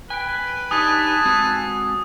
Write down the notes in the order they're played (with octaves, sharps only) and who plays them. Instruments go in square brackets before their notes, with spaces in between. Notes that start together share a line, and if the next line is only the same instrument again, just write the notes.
[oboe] B4 [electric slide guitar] G5 G#5
[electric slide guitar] D4 D#4 G4 [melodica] G#5 A5 [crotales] D#6
[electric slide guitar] G#3 C4 F#4